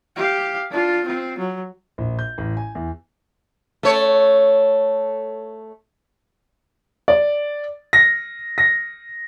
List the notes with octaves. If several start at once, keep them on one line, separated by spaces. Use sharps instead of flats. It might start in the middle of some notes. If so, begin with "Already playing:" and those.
G4 F5
D4 F4
C4 F4
F#3
A#1
G6
A1
G#5
E2
A3 C#5
D5
A#6
A#6